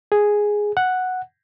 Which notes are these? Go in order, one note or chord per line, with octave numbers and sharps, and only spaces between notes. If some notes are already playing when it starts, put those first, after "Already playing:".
G#4
F#5